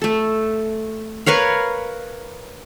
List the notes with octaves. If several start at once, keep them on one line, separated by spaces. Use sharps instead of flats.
A3 A4
A#4 B4 C#5 F5